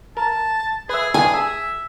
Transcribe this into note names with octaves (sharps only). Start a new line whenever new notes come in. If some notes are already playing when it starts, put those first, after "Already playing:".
A#4 A5
G#4 B4 E5
G2 G#4 G#5
G#4 E5